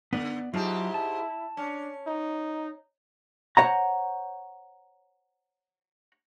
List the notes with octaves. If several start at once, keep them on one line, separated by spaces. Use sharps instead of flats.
D3 B3 D5
G#2 F#3 E4 F4 G4 A5
A5
C#4 D4
D#4
C5 C#5 F#5 A#5